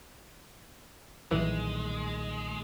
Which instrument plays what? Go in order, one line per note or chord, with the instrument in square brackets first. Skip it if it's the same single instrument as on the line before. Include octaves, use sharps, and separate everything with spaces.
[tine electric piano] B1 [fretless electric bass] A#2 D#3 G3 [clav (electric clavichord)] E3 [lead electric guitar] G#3